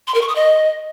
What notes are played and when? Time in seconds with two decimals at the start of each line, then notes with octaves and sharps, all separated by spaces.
0.07 C6
0.15 A#4
0.22 C#6
0.29 D#6
0.36 D#5